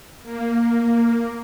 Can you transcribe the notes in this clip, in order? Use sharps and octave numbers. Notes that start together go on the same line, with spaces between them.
A#3